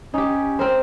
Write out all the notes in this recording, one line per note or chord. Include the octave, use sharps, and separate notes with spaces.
C#4 D#4 G4
C4 A#4 C5